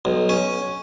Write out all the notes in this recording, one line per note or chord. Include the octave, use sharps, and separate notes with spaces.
B1
C#4